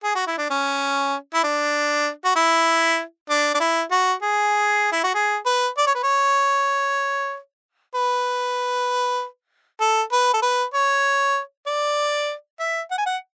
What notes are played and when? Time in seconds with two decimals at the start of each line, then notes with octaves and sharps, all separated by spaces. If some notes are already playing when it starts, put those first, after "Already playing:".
0.04 G#4
0.16 F#4
0.27 E4
0.38 D4
0.50 C#4
1.34 E4
1.44 D4
2.25 F#4
2.36 E4
3.30 D4
3.55 D4
3.60 E4
3.91 F#4
4.22 G#4
4.92 E4
5.04 F#4
5.15 G#4
5.46 B4
5.78 D5
5.87 C#5
5.95 B4
6.03 C#5
7.95 B4
9.81 A4
10.12 B4
10.34 A4
10.42 B4
10.74 C#5
11.67 D5
12.60 E5
12.91 F#5
12.98 G#5
13.06 F#5